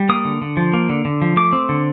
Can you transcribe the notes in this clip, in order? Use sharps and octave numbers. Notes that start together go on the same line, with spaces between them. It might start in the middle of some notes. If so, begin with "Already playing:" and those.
Already playing: G3
A#3 D#6
D3
D3
F3
A#3
D3
D3
F3
A3 D6
C4
D3